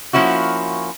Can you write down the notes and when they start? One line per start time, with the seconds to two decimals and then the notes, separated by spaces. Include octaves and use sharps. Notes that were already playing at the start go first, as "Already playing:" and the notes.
0.13 F3 A#3 C#4 E4 F#4